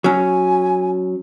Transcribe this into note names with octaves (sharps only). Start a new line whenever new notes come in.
F#3 C#4 G#5